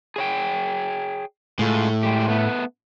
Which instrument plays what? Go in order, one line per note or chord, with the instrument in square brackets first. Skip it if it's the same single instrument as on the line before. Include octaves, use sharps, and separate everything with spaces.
[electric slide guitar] G#4 C#5 G5
[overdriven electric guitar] A2 [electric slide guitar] G#3 F4
[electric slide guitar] G#3 G4
A3 B3